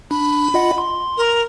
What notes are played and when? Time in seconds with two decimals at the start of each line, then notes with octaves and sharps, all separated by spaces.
0.11 D4 B5
0.54 F4 D#5 F#5
0.78 C6
1.17 A#4